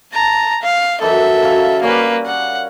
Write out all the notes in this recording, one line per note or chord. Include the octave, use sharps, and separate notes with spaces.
A5 A#5
F5
F#2 E3 D#4 A4 E5
C#3 F#3 F5
G3 A#3 C#4 B4 D5
A#4 F#5